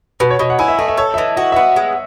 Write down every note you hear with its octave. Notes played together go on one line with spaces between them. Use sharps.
B2 B4
C#5
B2 D#5
F#5
E4 G#5
E5
A3 D#5
E5
A4 C#5
E5
E3 D#5
F#4 D#5
E5
B3 F#5
G#3